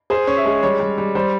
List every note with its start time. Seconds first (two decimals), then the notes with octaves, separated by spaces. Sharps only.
0.10 G#4 C5
0.27 C#4
0.37 E5
0.45 G#3
0.63 G3 C#5
0.80 G3
0.98 G3
1.15 G3 C5